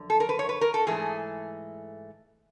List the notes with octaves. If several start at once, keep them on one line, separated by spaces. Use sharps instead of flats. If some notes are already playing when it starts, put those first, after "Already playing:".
Already playing: F#2 D3 F3
A4
A#4
B4
C#5
B4
A#4
A4
G#2 E3 A3 G#4